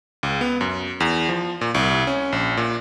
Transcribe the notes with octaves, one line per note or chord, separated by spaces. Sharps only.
C#2
B3
F#2
E2
F3
A#2
C2
C#4
A#1
A#2